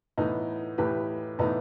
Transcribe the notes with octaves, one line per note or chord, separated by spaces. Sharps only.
A2 E3 B3 D#4
A2 E3 G4 B4
A2 E3 B3 D#4